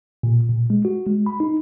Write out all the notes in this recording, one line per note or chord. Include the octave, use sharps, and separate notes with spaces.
A#2
A#2
G#3
F#4
G#3
B5
D#4